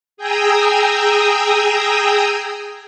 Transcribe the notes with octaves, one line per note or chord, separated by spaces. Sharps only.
G#4 G5 G#5 A#5 D#6 E6